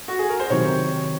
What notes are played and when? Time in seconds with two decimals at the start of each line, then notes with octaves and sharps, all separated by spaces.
0.08 F#4
0.19 G#4
0.29 A#4
0.40 C5
0.50 C3 D#3 F#3 C#5